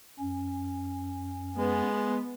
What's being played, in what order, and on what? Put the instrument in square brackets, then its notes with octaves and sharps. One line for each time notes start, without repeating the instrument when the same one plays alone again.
[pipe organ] F#2 C#4
[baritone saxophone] G#3 [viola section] B3